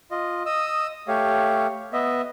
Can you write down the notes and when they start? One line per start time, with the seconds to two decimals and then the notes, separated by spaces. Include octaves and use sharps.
0.11 F4 D#5
0.46 D#5 D#6 E6
1.08 A3 G4 C#5 F5
1.93 B3 D#5 E5